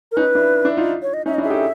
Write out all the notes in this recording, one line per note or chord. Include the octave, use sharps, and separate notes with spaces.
A#4
C#4 D#4 B4
D4 E4
D4 E4
D#4 F4
C#5
D#5
C#4 D#4 E5
D#5
D4 E4
G#4 E5
G4 A4